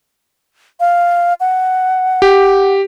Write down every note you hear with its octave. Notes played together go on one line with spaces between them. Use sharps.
F5
F#5
G4